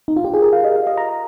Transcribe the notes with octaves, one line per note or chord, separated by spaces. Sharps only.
D#4
F4
G4
G#4
A#4
F5
D#5
F5
D#5
A#5